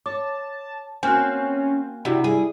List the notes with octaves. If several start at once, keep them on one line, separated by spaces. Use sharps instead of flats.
C#5 A5 D6
A#3 C4 C#4 F#4 G#5 F6 F#6
C3 D4 E4 F#4 G4
G3 G#4